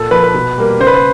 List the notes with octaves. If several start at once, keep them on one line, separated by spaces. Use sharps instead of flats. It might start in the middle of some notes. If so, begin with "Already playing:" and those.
Already playing: A#2 A4
F3 A#3 B4
B4
B2
G3 A#3
C#3 C5
B4
C5